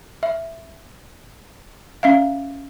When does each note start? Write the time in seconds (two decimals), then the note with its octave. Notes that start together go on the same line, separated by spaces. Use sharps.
0.23 E5
2.03 C#4 E5 F5